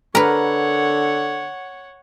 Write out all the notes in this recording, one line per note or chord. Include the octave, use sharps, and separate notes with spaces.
D3 A#4 B4 C#5 F#5